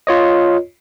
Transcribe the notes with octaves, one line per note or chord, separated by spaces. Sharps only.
F4 C#5 D#5